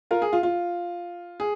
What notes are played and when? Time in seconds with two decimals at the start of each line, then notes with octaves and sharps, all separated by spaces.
0.11 F4 A#4
0.22 G#4
0.33 F4
0.43 F4
1.40 G#4